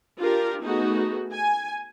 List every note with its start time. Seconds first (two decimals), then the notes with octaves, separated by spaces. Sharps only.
0.19 D4 F4 G4 A#4
0.62 A3 B3 D#4 F#4 G#4
1.33 G#5